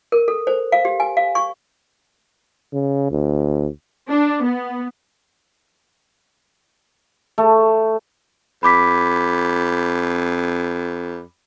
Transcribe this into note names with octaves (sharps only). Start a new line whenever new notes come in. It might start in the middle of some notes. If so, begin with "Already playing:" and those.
A#4
A4
C5
F5
G4
G#5
F5
C#6
C#3
D2
D4
B3
A3
F2 B5 D6 B6